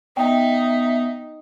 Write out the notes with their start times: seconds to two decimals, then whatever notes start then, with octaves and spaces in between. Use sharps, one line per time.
0.17 B3 D#4 E5 G5